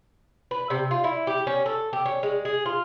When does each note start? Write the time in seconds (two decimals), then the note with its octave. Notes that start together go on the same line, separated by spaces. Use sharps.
0.51 B4
0.70 C3
0.91 F4
1.04 E4
1.27 G4
1.47 C#4
1.66 A4
1.93 G4
2.06 C#4
2.23 G#3
2.45 G#4
2.66 F4